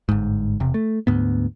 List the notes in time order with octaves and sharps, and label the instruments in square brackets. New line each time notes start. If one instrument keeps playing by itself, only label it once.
[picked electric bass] G1 G#2
E1 C3
A3
D2 G#2 B3